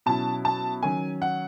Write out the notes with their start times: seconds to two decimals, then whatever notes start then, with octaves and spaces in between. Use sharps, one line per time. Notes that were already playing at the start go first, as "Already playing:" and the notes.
0.06 B2 F#3 C#4 E4 A5
0.45 A5
0.83 D#3 F#3 C#4 G#5
1.22 F#5